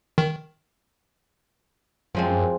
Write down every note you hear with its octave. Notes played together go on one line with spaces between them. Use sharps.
D#3
F#2 F3 G#3 C4